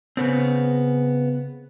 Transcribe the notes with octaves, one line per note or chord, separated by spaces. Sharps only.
C#3 B3 C4